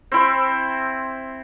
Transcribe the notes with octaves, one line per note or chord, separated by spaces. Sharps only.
C4 E4 C5